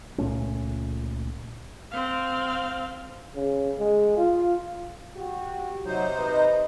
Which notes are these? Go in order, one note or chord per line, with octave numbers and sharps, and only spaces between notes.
C#2 A#2 A3 C#4
C4 F5
C#3
G#3
F4
F#4 G4
C3 F#3 D#4 C5
B4 D#5